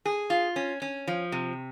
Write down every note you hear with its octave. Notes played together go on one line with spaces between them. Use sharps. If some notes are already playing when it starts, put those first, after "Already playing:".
G#4
F4
C#4
C#4
F3
C3